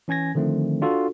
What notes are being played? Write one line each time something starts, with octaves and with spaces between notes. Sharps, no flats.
E3 C#4 G#5 G#6 A#6
D3 D#3 F3 A3 C4
D4 F4 F#4 A4